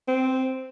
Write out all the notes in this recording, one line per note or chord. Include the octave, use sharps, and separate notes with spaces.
C4